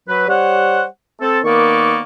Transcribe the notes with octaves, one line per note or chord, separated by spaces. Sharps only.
F#3 B4
G3 C5 C#5 F#5
C4 A4
D#3 A#3 B3 D5 C#6